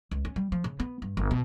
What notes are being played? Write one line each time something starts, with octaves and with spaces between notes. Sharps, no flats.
C#2
C#4
G3
F3
C#3
B3
G2
G1
B2